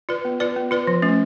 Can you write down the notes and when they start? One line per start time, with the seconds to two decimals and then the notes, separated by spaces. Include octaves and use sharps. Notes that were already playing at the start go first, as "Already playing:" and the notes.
0.09 F4 B4 D5
0.25 B3
0.40 F4 B4 D5
0.56 B3
0.71 F4 B4 D5
0.87 F3
1.02 A3 C#4